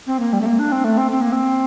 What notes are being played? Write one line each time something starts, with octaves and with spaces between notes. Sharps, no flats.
C4
A#3
G3
A3
A#3
D4
C4
A3
C4
C4
A#3
C4